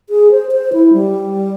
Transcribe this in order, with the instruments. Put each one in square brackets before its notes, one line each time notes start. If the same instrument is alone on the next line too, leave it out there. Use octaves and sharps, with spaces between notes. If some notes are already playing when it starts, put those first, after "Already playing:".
[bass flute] G#4
C5
C5
E4
G3